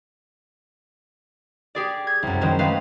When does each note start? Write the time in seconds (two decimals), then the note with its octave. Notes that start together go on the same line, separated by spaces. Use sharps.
1.75 G4 G#4 D5
2.07 G#6
2.23 C2 F#2
2.41 D#3 F#3 G#3 C#4 C5
2.59 G#3 A3 B4 C5 F5